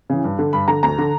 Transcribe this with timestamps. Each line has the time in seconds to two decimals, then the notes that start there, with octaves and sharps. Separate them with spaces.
0.10 C#3 E3
0.24 G2
0.39 D3
0.53 G2 B5
0.68 D3 A#5
0.83 D2 A#5
0.99 D3